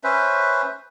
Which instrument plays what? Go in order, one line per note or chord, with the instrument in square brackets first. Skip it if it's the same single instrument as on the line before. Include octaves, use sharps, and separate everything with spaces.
[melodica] C#4 B4 C5 E5